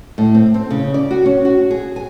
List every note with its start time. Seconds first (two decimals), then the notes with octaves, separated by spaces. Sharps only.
0.18 A2
0.34 C4
0.54 C4
0.70 C#3
0.94 D5
1.11 F#4
1.26 C#4
1.45 F#4
1.71 G#4
1.96 G#5